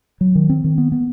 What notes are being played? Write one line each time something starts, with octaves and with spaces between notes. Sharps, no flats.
F#3
D#3
C4
D#3
B3
B3